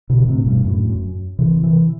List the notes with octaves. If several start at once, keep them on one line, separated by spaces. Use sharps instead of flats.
B2 D3
A2 C3
G2 B2
F#2 A2
F#2
C3 E3
C3 E3